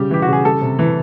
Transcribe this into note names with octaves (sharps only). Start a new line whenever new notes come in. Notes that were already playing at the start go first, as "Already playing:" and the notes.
Already playing: C#3 G3 G4
E3 G4
F#4
C#3
G#4
G3 A4
C3
E3